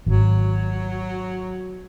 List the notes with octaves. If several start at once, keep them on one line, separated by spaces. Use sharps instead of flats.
G#1 F#3